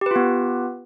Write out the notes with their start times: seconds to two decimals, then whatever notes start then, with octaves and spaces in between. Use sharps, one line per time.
0.01 G4
0.06 B4
0.11 F4
0.16 B3